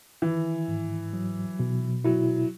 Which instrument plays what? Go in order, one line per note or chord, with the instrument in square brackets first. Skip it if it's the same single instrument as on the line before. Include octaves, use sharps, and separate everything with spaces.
[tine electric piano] D#3 [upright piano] E3
[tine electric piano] G#2
F#3
B2
[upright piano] F#3 [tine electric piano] E4